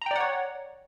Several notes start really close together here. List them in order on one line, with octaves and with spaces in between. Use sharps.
A#5 G5 D5 F#5 C#5